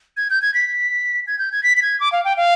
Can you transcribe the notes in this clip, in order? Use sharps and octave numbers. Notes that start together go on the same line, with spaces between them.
G#6
G6
G#6
B6
G#6
G6
G#6
B6
B6
G#6
D6
F5
G5
F5